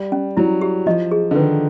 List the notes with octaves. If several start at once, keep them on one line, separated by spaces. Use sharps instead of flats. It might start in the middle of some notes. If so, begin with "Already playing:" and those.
Already playing: G3
C#4
F#3 E4
G4
F3 D#5
G#4
D3
D#3 B4